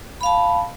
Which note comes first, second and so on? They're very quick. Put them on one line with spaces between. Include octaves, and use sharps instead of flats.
B5 F5 A5